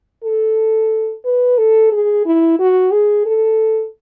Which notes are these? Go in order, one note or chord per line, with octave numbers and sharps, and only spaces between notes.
A4
B4
A4
G#4
E4
F#4
G#4
A4